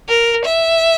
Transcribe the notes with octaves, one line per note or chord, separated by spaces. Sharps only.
A#4
E5